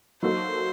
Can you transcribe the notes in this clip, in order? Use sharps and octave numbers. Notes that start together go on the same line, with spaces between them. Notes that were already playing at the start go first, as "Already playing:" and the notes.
F#3 A#3 D#4 F#4 A4 C5